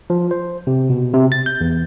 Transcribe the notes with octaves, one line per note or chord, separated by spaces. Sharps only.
F3
C5
C3
B2
C3
A6
G6
E2